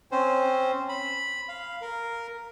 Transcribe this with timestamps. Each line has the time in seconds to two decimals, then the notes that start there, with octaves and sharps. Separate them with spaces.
0.12 C4 C#4 C5
0.89 B5
1.49 F5
1.81 A#4